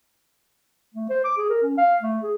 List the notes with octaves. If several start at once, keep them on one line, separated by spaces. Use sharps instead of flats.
A3
C5
D6
G#4
A#4
C#4
F5
A3
G#4